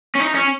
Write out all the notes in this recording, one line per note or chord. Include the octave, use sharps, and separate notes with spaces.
C#4
D#4
C#4